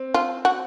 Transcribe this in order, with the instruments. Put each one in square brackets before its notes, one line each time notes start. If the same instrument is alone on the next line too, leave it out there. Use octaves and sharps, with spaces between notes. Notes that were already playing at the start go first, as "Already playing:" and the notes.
Already playing: [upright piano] C4
[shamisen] F4
F#4